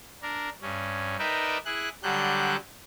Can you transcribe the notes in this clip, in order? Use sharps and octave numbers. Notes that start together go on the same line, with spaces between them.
D4 A#4
G2 C#4
D#4 A#4 B4 D5 E5 G5
E4 G#4 F#6
D3 F#3 G3 D4 F#6 G6